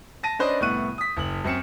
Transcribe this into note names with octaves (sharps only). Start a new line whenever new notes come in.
A5 A#6 D#7
C#4 D4 B4 C5 D5 D#5
C2 A2 B3 C#6 F#6 D#7
D#6 B6
F#1 F#7
F#2 C4 C#7 E7